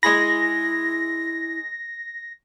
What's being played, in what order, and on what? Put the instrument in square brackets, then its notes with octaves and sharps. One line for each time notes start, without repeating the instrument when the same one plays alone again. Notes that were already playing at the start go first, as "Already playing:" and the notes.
[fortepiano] G#3 G#4 B5 [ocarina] E4 [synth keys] A#6